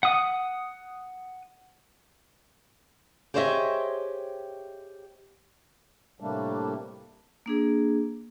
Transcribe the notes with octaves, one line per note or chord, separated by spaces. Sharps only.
F#5 D#6
G4 G#4 C5 C#5 D#5 E5
A2 C3 G3 A3 A#3 D4
A#3 D4 G#4